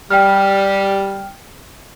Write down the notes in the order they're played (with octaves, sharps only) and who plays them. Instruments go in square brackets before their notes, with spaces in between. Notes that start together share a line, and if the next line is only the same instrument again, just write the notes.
[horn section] G3 [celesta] G5 F6